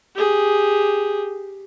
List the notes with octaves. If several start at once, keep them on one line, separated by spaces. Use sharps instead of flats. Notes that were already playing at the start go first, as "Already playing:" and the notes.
G4 G#4